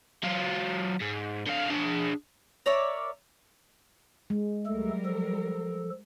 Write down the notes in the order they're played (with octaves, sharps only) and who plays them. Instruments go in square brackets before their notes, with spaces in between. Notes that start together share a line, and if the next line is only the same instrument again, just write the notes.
[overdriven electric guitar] F#3 F4
G#2
D3 F5
D4 G#4
[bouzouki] A#4 C#5 D5 E5
[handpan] G#3
[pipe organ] D2 A3 A4 [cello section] F#3 G3 A#4
[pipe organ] F3 A4